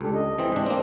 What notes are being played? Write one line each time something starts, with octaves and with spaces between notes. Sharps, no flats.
C#2 D4 G4 A4
D#5
E3 C4
G#2 D4
A#3 C4